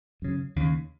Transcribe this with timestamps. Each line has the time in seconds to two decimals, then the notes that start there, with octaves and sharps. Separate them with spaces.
0.22 F#2 C#3
0.56 D#2 C#3